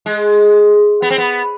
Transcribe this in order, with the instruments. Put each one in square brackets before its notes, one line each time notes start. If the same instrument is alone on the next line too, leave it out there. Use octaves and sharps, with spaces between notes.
[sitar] G#3
B3
C4
B3